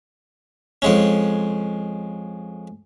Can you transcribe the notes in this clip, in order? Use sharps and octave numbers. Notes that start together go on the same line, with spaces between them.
F2 G#3 C#4